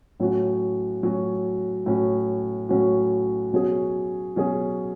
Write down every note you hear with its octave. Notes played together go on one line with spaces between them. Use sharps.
A2 F#3 C#4 F#4
A2 F#3 C#4 F#4
A2 F#3 C#4 F#4
A2 F#3 C#4 F#4
B2 F#3 C#4 G#4
B2 F#3 C#4 G#4